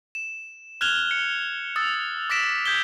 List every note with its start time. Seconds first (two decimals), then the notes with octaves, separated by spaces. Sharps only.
0.15 E7
0.81 F6 F#6 G#6 E7 F7 G7
1.11 C#7
1.76 D#6 E6 A6
2.30 D6 E6 A#6 B6 D7 E7
2.65 D#6 G6 G#6 B6 G7